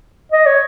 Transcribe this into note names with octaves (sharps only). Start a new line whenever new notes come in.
D#5
C#5